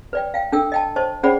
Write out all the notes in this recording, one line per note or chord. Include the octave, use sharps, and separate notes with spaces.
B4 D5 G5
F5 G5
D4 A4 G5 E6
D#5 G5 A5
C5 D#5 A5 C#6
C#4 G#4 C5 D5 F#5 B5